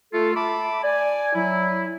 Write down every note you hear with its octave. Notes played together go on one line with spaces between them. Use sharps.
A3 F4 A4
E5 A5 B5 D6
D5 G#5
F#3 E4